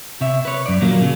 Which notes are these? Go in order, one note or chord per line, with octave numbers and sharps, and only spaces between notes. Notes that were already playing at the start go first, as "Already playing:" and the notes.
C3 C#5 E5
B4 C#5
F#2 D5
A#2 D#3 F3 F#3 A#3
C#3 F#3